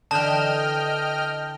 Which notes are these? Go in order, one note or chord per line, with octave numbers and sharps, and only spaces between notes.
D3 E3 D#5 G5 A5 F6